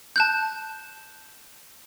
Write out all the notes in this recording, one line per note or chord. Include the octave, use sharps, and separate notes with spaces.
A5 F#6 G6